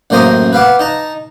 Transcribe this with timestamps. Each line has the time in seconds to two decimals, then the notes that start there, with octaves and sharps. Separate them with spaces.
0.10 A1 F#2 A#3 C5 A#5 D#6
0.53 B4 F5 F#5 D6
0.79 D#4 A5 A#5